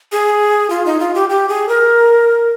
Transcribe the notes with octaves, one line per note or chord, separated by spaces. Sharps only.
G#4
F4
D#4
F4
G4
G4
G#4
A#4